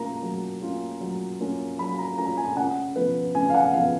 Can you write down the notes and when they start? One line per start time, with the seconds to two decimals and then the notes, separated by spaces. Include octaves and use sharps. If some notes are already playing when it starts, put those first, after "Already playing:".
Already playing: F#3 A#3 C#4 F4 A#5
0.23 F#3
0.62 A#3 C#4 F4
1.01 F#3
1.40 A#3 C#4 F4
1.79 F#3 B5
1.98 A#5
2.18 A#3 C#4 F4 A#5
2.37 G#5
2.57 C#3 F#5
2.96 F3 B3 B4
3.35 C#3 G#5
3.50 F5
3.54 F#5
3.74 F3 B3 F5